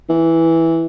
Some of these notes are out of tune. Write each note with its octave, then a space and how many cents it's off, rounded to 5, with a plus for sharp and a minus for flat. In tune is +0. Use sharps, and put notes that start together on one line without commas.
E3 -5